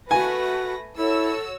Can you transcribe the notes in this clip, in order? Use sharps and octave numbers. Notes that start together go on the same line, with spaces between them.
A3 F#4 B4 G#5 A#6
E4 F#4 A4 C#5 E6